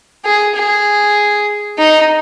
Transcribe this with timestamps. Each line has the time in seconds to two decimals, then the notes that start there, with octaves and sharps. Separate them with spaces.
0.25 G#4
0.56 G#4
1.79 D#4